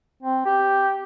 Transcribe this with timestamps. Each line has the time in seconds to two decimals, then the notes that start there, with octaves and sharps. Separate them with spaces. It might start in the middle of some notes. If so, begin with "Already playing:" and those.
0.23 C4
0.46 G4